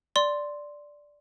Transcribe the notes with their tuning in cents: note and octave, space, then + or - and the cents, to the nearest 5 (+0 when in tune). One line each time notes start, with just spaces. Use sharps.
D5 +0 C6 +0